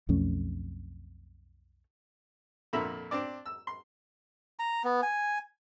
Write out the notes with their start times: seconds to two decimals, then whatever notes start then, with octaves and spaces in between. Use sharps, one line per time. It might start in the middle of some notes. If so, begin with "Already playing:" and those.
0.09 B1 F2 A3 C#4
2.73 F2 A#2 D3 E5 A#5 B5
3.11 C4 D4 D5
3.46 E6
3.67 C6
4.59 A#5
4.84 B3
5.03 G#5